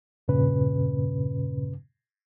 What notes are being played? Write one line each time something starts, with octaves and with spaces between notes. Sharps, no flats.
E2 G2 A#2 C#3 C#4 B4